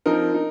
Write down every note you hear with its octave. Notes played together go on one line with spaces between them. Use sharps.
F3 C4 D#4 A#4
D#4